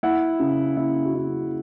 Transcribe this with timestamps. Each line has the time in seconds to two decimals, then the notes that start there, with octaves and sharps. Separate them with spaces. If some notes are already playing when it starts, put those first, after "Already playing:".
0.03 E4 F#5
0.40 C#3
0.77 E4
1.05 F#4
1.15 C#3 E4